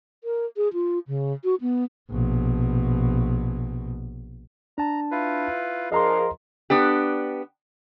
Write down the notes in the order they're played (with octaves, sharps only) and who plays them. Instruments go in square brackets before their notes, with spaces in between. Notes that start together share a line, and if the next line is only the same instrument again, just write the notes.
[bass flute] A#4
G#4
F4
C#3
F#4
B3
[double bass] A#1 B2
[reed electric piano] D4 A5 [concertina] A#5
[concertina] E4 F4 B4
[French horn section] F3 G#4 A#4 [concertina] D4 F5 [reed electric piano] D#5 A#5 C6
[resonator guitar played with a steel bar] B3 D4 G4